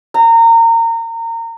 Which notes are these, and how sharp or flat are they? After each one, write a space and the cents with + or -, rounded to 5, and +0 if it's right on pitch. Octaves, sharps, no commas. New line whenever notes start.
A#5 -25